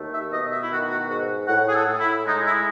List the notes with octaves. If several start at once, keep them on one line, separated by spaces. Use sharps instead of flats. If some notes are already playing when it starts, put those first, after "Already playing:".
Already playing: D#2 A3
E5
B2 D#5
E5
E4
D#3 F#4
F#4
G#2 F#4
A2 F#5
G#4
A4
A2
E4
G#3 D#4
E4